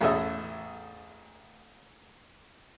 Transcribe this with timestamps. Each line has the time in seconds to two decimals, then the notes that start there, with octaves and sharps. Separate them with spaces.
0.01 A1 E2 C#4 A4 D#5 E5